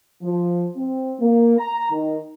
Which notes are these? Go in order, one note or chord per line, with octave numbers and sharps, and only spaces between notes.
F3
C4
A#3
A#5
D#3